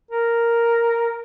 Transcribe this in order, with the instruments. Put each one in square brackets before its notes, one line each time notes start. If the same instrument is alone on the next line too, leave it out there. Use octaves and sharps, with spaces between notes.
[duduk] A#4